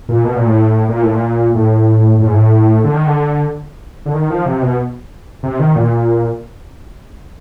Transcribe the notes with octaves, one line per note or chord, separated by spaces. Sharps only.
A#2
B2
A#2
A2
A#2
A2
A#2
A2
A2
G#2
A2
D3
D#3
D3
D3
D#3
F3
C3
B2
C3
D#3
A#2